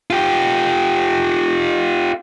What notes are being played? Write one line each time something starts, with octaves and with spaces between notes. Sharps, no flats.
F4 G4